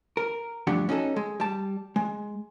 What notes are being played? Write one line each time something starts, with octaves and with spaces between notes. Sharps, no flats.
A#4
G2 F3 A3 D4 G4 F#5
C#4 D#4 F#4 G#4 A4
G#3
G3 A5
G#3